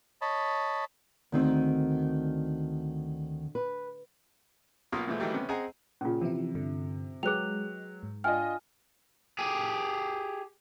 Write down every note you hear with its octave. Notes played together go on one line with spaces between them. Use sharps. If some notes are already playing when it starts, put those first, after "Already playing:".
C#5 D#5 A5 B5
D2 D#3 C4
B4
B1 A#3 F4 D#6 F6
A#2 E3 F3 G#3 A3
D#3 E3 F#3 G3 A3
C3 B3 C#4
C4 G#4 D#5 F#5 G#5 A#5
A#2 C#3 C#4 F4
C3 E3 F3 E4
G2 D3
F#3 G#3 G#4 B4 G5 F#6 F7
G#2
D4 F4 D#5 G5 G#5 F6
G4 G#4